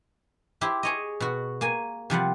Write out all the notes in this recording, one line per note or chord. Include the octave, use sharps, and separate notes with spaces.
E4 G4 C5
G#4 C#5 D#5
B2 F#4
A#3 G#5
C3 F3 G3 F#5